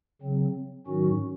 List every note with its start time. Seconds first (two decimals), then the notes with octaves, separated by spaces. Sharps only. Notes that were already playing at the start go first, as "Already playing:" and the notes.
0.22 C#3 F#3 C4
0.87 G#2 D#3 F#3 C#4 F#4